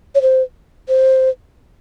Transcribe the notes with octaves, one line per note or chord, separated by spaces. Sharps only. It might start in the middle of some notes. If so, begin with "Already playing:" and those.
C#5
C5
C5